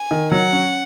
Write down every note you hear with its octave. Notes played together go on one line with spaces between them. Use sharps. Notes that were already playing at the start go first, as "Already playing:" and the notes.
Already playing: G#5
D#3
F#3 F#5
C#4